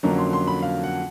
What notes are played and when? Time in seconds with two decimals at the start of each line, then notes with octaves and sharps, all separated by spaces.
0.03 F2 D3 F#3 A#3 C#4 A#5
0.18 C6
0.33 C6
0.47 B5
0.62 F5
0.83 F#5